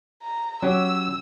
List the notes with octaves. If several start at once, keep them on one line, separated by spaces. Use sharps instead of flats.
A#5
F#3 C#4 G4 E6